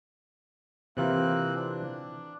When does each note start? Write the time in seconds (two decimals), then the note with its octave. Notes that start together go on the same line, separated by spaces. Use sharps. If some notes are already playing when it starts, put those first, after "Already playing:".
0.97 C3 E3 A#3 C4 F4 F#6
1.55 D4